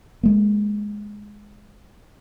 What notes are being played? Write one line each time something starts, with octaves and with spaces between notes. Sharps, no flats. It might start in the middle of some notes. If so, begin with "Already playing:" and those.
G#3 A#3